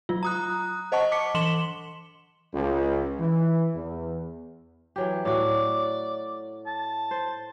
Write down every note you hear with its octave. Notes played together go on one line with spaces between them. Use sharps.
F#3 F4
A#5 D#6 F#6
C5 D#5 F#5 A5 C#6
D6 B6 C#7
E3 C6 E7 F#7 G7
C#2
E3
E2
E3 F#3 G4
A2 F#4 D5
A5
C5